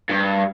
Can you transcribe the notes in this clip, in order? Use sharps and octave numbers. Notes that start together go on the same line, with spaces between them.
G2